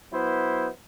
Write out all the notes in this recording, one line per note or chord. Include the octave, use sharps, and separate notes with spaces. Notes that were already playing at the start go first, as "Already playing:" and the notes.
F#3 B3 E4 C5